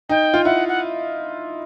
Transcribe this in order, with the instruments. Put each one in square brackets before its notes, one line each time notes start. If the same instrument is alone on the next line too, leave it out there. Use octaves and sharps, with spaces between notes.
[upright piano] D#4 [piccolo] G5
[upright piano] F4
[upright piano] E4 [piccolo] F#5
[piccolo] F#5